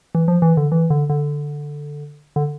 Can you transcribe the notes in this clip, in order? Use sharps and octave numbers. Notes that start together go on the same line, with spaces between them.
E3
F3
E3
D3
E3
D3
D3
D3